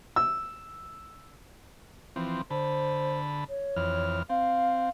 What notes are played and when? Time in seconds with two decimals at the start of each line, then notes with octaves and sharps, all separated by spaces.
0.16 E6
2.16 E3 F3 C4
2.50 D3 C5 A5 B5
3.49 C#5
3.76 F2 E3 F6
4.30 C4 F5